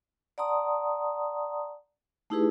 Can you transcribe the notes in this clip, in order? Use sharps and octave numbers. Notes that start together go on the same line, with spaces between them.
D5 F#5 A5 A#5 C6 D#6
A3 D#4 E4 G4 G#4 B4